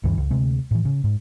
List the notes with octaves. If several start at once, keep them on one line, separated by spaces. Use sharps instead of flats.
D2 G2 D#3 E3
C#2
D2 C3 G#3 C4
A2 E3
C#3
G#2